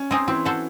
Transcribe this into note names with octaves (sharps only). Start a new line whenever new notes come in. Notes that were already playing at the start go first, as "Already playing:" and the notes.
Already playing: C#4
C4 D#4 G#4
E3 C4
F#4 A4 C5